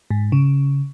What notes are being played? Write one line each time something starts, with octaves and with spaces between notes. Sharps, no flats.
G#2
C#3